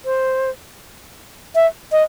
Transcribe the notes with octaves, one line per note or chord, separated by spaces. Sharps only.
C5
E5
D#5